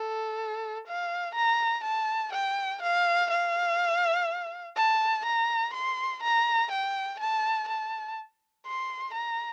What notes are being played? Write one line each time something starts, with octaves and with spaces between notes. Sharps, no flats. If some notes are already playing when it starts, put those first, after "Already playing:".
Already playing: A4
F5
A#5
A5
G5
F5
F5
A5
A#5
C6
A#5
G5
A5
A5
C6
A#5